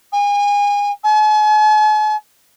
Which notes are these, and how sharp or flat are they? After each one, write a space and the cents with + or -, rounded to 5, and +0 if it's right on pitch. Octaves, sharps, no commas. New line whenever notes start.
G#5 -30
G#5 +45